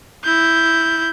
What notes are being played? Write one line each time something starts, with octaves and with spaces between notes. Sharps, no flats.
E4 G6